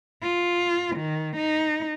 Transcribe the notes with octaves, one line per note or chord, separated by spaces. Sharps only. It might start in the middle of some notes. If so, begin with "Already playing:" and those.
F4
D#3
D#4